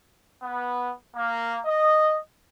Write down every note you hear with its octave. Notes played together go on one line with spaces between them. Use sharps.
B3
A#3
D#5